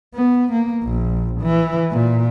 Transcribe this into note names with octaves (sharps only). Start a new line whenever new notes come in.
B3
A#3
A#1
E3
A#2